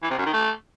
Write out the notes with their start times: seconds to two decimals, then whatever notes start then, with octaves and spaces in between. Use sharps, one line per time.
0.03 E3
0.10 C3
0.18 F#2
0.26 D#3
0.34 A3